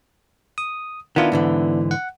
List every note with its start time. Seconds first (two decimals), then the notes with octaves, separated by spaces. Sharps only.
0.58 D#6
1.16 D#3 B3 D4 E4 F4
1.32 G#2 D3 E3
1.91 F#5